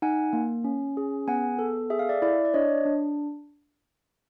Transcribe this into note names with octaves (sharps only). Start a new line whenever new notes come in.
D#4 F#5 G#5
A#3
C#4
G#4
B3 F#5 G#5
A4
G#4 E5
F5
D5 E5
E4 D5 E5
D5
D4 C#5 D#5
D4